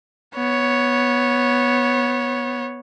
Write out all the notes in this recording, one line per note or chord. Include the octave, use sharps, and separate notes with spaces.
B3 C#5